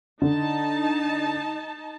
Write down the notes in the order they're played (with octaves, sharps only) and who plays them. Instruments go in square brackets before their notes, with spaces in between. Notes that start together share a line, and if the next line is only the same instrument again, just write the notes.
[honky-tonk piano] D3 [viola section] D#4 A5